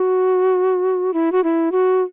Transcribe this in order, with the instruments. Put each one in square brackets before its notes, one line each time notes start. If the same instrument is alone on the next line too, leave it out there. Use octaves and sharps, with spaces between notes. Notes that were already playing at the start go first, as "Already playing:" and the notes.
Already playing: [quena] F#4
E4
F#4
E4
F#4